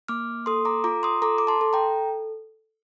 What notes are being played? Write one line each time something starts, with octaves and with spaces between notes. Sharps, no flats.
A#3 D6 F6
A4 C6 D#6
A#5 D6
F4 A#5 D6
C6 D#6
A4 A#5 D6
D6
A5 C6
A4
G5 A#5